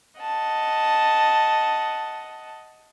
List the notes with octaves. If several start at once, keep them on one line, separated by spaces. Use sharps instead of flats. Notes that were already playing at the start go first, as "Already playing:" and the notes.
D#5 F#5 A5